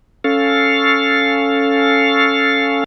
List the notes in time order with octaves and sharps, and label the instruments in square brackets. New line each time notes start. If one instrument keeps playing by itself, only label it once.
[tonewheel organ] C#4 A4 F5